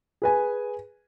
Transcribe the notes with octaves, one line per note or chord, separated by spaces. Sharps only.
G#4 B4 G#5